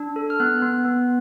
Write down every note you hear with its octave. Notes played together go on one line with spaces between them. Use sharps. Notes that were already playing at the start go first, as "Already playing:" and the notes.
Already playing: D4
A4
F6
B3 F#6
B3
B3